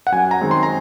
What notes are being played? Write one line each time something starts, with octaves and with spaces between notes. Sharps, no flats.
F#5
F#2 G#5
A#5
D#3 G#3 C4
C6
A#5